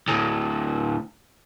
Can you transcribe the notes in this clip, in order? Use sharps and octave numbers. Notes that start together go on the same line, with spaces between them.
D2 A2